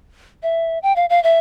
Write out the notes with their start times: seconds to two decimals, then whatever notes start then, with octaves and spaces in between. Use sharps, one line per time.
0.43 E5
0.83 G5
0.96 F5
1.09 F5
1.23 E5